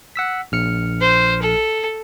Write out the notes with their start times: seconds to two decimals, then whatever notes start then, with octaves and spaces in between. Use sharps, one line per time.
0.16 F#5 E6 B6
0.52 A#1 F6 C#7
1.01 C5
1.42 A4